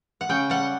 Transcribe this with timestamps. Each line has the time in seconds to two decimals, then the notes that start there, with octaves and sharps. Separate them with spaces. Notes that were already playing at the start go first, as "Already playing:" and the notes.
0.21 F#5
0.29 C#3 G5
0.50 G3 F#5